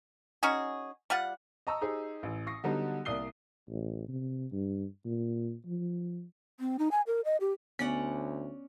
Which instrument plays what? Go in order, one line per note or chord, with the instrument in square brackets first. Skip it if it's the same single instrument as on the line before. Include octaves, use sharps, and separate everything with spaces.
[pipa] C#4 D#4 F#4 G#4
G3 F4 F#5
[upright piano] D#5 A5 A#5 C#6 D#6 E6
D#4 G4 G#4 C5
A1
C#6 D#6 A#6 C7
D3 F#3 G3 B3 D#4
C2 A#3 D5 D#6 C7 G7
[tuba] A1
C3
G2
A#2
F3
[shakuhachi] C4
D#4
G#5
A#4
D#5
G4
[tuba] D2 [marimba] B3 [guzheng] C#4 D5 F#5